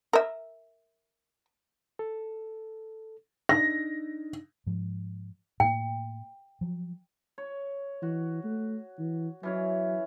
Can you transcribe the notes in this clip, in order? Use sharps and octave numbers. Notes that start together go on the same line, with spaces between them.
A#4 E5
A4
D4 D#4 A#6
G#2 F3
A2 A#3 G5
F3 F#3
C#5
E3 F#4
A3
E3
E3 F#3 C#4 C#5